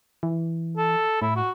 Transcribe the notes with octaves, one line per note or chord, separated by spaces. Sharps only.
E3
A4
A2 E4
F#4